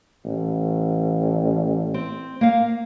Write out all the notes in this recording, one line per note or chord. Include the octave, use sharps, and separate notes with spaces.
A1
C4
A#3 F5